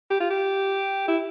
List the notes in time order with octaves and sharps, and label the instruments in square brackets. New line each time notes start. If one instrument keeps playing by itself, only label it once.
[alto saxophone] G4
F4
G4
E4